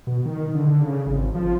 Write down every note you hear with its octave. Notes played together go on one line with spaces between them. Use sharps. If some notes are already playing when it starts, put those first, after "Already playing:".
B2
D#3
D3
C#3
G#1
F3